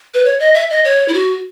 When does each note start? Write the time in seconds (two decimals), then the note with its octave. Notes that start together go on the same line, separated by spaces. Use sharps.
0.14 B4
0.25 C#5
0.40 D#5
0.54 E5
0.70 D#5
0.85 C#5
1.08 E4
1.14 F#4